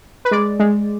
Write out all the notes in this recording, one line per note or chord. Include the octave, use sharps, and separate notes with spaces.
B4
G#3 D5
G#3